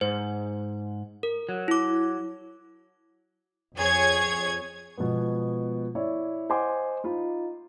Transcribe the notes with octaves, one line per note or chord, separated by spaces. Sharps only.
G#2 C5
A#4
F#3
E4 D6
F2 G#4 C#5 G#6
B2 F3 G#3 B3
E4 C#5 D5
C5 D#5 F#5 G#5 C6 D6
D#4 F4 B5